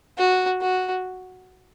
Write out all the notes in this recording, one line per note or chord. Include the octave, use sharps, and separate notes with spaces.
F#4
F#4